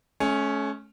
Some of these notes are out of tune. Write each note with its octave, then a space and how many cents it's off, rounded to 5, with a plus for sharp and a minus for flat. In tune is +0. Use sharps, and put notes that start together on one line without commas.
A3 -40 C#4 +0